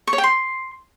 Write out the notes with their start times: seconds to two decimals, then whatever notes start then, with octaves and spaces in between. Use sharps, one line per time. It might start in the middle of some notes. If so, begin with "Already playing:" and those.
0.07 C#6
0.13 C#5
0.18 G5
0.24 C6